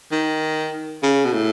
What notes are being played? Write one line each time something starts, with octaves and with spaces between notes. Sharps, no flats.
D#3
C#3
B2
A2